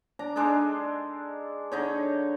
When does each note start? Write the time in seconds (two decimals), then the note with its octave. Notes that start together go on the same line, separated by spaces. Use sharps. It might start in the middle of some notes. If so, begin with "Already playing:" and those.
0.19 D4 A#5
0.36 G#3 D4 D#4 A4
1.72 D3 D#4 C#5